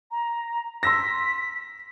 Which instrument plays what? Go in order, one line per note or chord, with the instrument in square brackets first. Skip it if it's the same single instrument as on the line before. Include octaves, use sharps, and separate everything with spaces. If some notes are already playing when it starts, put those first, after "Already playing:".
[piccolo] A#5
[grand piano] C6 E6 A#6 [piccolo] B6